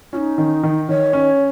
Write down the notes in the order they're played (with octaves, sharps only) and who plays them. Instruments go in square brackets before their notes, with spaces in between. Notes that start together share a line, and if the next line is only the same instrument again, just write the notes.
[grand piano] C#4 [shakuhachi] F4
[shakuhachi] D#4
[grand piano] D#3
D#3
[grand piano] D#3 [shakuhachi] C#5
[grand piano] C#4